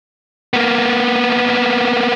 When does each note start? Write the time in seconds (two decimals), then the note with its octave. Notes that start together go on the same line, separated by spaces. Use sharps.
0.54 A#3 B3